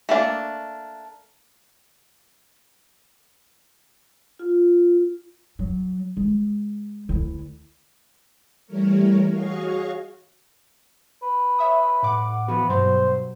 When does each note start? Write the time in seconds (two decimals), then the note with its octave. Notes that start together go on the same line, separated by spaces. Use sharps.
0.09 A3 A#3 D4
4.39 F4
5.59 F#3
6.17 G#3
7.09 D2 E4
8.66 E3 G3 A3 A#4 C#5
9.30 F#4 G#4 C#5 D#5 F5 C#6
11.23 B4
11.59 C#5 E5 D#6
12.03 A2 F#5 D6
12.48 E3 F3 B3 F#4
12.69 G2 B2 F#3 C5